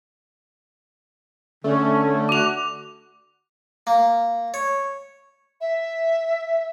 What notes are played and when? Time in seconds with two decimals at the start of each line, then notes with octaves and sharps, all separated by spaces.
1.64 D3 A3 C#4
2.29 F#4 D6 F7
3.87 A#3
4.54 C#5
5.61 E5